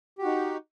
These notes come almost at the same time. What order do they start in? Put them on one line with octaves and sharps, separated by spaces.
G4 F#4 D#4